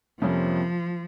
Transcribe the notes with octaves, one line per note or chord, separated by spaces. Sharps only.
F2 C3 F3 G3 A#3 C#4